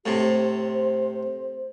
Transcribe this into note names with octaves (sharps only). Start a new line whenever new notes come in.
A2 C3 G4
C5